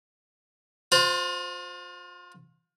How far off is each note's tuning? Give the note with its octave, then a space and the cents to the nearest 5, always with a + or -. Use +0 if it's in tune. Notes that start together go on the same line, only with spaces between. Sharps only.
F4 +35 C5 -5